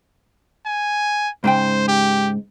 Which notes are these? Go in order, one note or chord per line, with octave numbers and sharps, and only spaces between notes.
G#5
G#2 C#3 C5 G5
G4